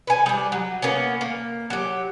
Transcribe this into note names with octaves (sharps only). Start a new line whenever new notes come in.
B4 G#5
G3 D4
F#3
A#3 B3 C#4
A#3
F#3 G4